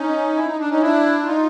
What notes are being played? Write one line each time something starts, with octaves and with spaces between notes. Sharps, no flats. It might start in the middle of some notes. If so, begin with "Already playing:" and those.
Already playing: C#4 D#4
E4
D#4
D4
C#4 D#4
D4 E4
E4
D#4 F4